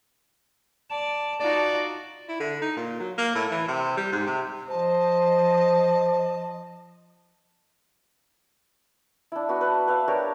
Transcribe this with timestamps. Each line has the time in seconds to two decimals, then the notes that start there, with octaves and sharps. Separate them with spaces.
0.90 D5 A5
1.40 D#4 F4 F#4 D5
2.28 E4
2.40 D3
2.61 D#4
2.77 A#2
3.00 F#3
3.18 A#3
3.35 A2
3.51 E3
3.68 C3
3.97 G3
4.12 G#2
4.26 C3
4.70 F3 C5 D#5 A5
9.32 D4 E4
9.49 B3 F#4 B5
9.61 B4 A5
9.87 B4 E5 F5
10.08 D4 G4 A#4 C#5